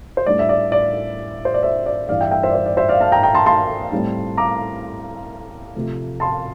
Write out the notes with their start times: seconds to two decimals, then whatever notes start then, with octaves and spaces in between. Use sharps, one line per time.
0.17 C5
0.26 A2 G3 D4 D5
0.39 E5
0.49 D5
0.72 D5
1.45 C5
1.54 D5
1.63 C5 E5
1.86 D5
2.09 G2 E3 G3 D5 F5
2.21 E5 G5
2.31 E5 G5
2.43 C5 E5
2.50 D5
2.55 C5
2.66 D5
2.77 C5 E5
2.89 D5 F5
3.01 F5 A5
3.12 G5 A#5
3.23 G5 A#5
3.35 A5 C6
3.46 A5 C6
3.92 A2 G3 C4
4.37 A#5 D6
5.75 C3 F3 A3
6.20 A5 C6